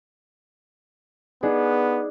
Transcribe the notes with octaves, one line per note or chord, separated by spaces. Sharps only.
B3 D4 D#4 G#4